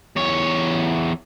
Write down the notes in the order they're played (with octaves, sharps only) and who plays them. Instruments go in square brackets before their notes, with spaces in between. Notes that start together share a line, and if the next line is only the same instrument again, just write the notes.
[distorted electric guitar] E2 C#5